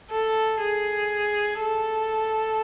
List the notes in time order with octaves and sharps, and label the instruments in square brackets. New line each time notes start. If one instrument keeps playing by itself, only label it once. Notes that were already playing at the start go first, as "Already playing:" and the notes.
[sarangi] A4
G#4
A4